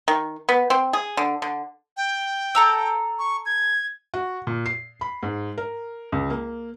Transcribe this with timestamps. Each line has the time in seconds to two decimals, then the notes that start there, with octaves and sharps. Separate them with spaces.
0.08 D#3
0.49 B3
0.70 C4
0.93 G#4
1.17 D3
1.42 D3
1.97 G5
2.55 A4 A#5 E6
3.19 C#6
3.46 G#6
4.14 F#4
4.47 A#2
4.66 C7
5.01 B5
5.23 G#2
5.58 A#4
6.12 C#2
6.30 A#3